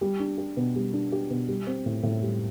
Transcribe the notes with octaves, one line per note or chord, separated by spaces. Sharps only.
G3
D4
G4
B2
G3
D4
G4
B2
G3
C4
A2
A2
G3